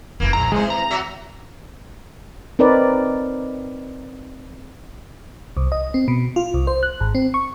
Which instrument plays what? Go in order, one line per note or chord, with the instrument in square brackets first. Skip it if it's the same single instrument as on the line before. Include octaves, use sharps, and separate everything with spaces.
[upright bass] F1 D#2 [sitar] E3 A#3
[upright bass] A#1 E2 [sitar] G#2 [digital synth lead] A#5
[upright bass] D#3 C4 [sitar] E3 C5 [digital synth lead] G#3
[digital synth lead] A#5
[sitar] F#3 F#4 E5
[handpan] C4 D#4 A#4 B4 D5
[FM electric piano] C2
D#5
C4
B2
F4
C2
C5
F#6
G#1
C4
C#6